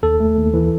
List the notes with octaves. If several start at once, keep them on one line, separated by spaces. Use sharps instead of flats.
D#2 A4
A3
D#2
E3